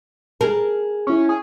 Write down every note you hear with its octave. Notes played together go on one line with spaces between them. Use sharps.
G#4 A#4 A5
C#4 E4 C#6
G#4